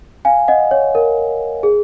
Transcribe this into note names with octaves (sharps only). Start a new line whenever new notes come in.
F5 G#5
D#5 F#5
C#5
A#4
G#4